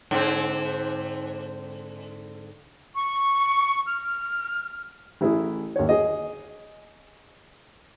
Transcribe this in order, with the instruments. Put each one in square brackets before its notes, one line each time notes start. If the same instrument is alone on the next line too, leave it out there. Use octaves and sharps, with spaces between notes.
[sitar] G#2 D3 C4
[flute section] C#6
F6
[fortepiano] A1 E4 G#4
D#2 C#5
G#4 D#5